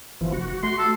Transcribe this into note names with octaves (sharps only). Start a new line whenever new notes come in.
G1 E3 F3
F1 F#4
A3 C6
A4